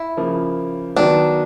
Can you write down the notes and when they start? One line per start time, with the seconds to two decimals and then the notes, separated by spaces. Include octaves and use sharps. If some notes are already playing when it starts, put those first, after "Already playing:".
Already playing: E4
0.17 C#3 F3 A#3
0.97 D#3 F#3 B3 D4